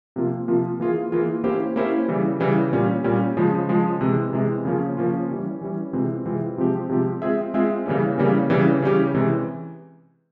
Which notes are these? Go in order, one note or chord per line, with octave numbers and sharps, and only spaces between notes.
C3 F3 A#3 F4
C3 F3 A#3 F4
E3 A#3 F4 G#4
E3 A#3 F4 G#4
A#3 C#4 E4 G4 C5
A#3 C#4 E4 G4 C5
C#3 E3 G3
C#3 E3 G3
A#2 G3 C#4
A#2 G3 C#4
C#3 F3 G#3
C#3 F3 G#3
C3 E3 G#3
C3 E3 G#3
C#3 F3 A#3 C#4 F4
C#3 F3 A#3 C#4 F4
E3 G3 C#4
E3 G3 C#4
C3 E3 G#3 C4 F4
C3 E3 G#3 C4 F4
C3 F3 G#3 C4 G4
C3 F3 G#3 C4 G4
G#3 C4 F4 G#4 E5
G#3 C4 F4 G#4 E5
C#3 E3 G3 A#3 C#4
C#3 E3 G3 A#3 C#4
C#3 E3 G3 C#4 G4
C#3 E3 G3 C#4 G4
C3 E3 G#3 C#4